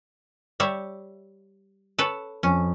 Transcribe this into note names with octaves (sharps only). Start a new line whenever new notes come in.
G3 C#5 E5
A4 B4 C#5
F2 C#4